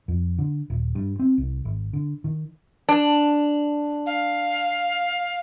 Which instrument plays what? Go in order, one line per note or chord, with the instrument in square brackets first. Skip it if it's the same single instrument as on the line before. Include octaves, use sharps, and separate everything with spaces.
[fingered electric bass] F2
D3
D#1
G2
C4
C2
G#1
D3
D#3
[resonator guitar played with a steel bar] D4
[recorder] F5